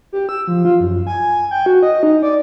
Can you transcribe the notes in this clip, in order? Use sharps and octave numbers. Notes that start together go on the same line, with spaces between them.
G4
E6
F3
F4
F#2
G#5
G5
F#4
D#5
D#4
D5